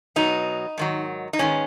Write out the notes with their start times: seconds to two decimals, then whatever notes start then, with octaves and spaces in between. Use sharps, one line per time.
0.16 B2 F#3 B3 D#4
0.78 G#2 D#3 F#3
1.33 D#4
1.39 G#2 D#3 G#3 B3 C#4